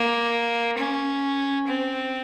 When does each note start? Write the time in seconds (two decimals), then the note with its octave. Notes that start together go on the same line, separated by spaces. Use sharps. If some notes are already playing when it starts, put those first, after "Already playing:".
Already playing: A#3
0.78 C#4
1.67 C4